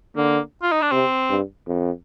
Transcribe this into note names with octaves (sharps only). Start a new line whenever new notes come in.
D3 A#3
F4
D#4
D4
C3 C4
G2
F2